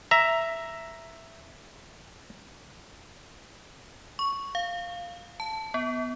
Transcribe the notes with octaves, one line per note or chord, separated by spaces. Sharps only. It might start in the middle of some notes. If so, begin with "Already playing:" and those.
E5 A#5
C#6
F5
A5
B3